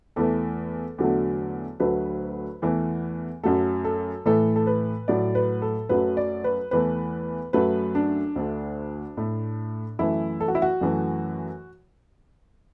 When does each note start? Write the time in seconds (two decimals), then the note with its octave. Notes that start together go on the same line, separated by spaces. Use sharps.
0.16 E2 E3 A3 A4
0.98 E2 D3 F#3 A3
1.80 D2 D3 F#3 A3 B4
2.62 E2 E3 A3
3.43 F#2 F#3 A3 A4
3.85 A4
4.26 A2 E3 A3 A4
4.56 A4
4.67 B4
5.08 A2 F#3 A3 D5
5.35 B4
5.62 A4
5.89 F#2 F#3 A3 B4
6.17 D5
6.44 B4
6.71 E2 E3 A3 B4
7.53 F#2 F#3 A3 B4
7.95 D4
8.36 D2 D3 A3
9.17 A2 A3
9.99 F#2 E3 A3 E4
10.40 A4
10.48 F#4
10.55 E4
10.62 F#4
10.81 F#2 E3 A3